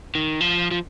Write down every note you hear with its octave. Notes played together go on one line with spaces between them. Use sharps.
D#3
F3
F3